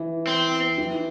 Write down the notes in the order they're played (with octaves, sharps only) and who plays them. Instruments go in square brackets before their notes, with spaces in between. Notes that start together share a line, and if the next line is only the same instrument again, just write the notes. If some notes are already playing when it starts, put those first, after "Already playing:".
Already playing: [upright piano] E3
[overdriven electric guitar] C4
[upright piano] E3